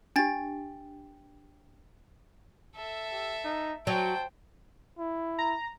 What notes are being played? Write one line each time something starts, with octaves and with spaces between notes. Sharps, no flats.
D4 G4 G5 A6
A4 E5
G4
D#4
F#3 C5 G5 A5
E4
A#5